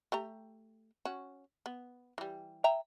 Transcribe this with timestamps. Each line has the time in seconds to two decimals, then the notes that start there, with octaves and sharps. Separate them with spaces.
0.12 A3 G4 A#5
1.05 C#4 F#4
1.66 B3
2.18 E3 G3
2.64 E5 G5 A#5